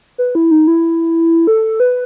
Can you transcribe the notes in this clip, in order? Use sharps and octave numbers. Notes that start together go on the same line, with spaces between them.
B4
E4
D#4
E4
A4
B4